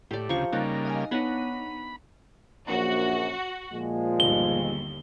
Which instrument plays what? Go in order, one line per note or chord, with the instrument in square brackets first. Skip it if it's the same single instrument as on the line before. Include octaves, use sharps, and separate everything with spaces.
[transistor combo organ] A2 [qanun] G4 D5
[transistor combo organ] D2 C#3 [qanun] F3 C#6 [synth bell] A#5 G6
[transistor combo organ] C#3 G3 A#3 [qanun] D#4 [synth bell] F#6 A6 A#6
[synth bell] D#5 F5 G#5
[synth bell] B3 D#4 [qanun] D4 C#5 F#5 [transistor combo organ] B5
[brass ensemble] A#1 F#2 [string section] F#4
[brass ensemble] A#2 F3 G#3
[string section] G1 D#2 [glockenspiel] G7